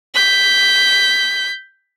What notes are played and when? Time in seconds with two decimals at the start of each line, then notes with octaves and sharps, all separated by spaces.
0.14 G6 B6